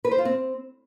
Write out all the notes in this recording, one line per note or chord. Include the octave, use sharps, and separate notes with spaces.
B4
C5
F4
C4